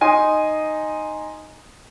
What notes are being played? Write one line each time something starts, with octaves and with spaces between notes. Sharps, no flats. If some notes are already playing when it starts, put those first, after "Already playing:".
D#4 G#5 C6 D#6